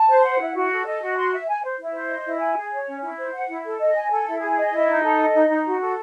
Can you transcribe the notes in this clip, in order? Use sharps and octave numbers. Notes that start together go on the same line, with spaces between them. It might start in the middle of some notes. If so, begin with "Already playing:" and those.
Already playing: A5
C5
F#5
E4
F#4
A4
D#5
F#4
C6
E5
G#5
C5
E4
C5
D#5
E4
G#5
G#4
C#5
C#4
E4
C5
F#5
E4
A4
D#5
G#5
A4
E4
G#4
D#5
E4
D#4
A4
D#5
D#4
D#4
F#4
A4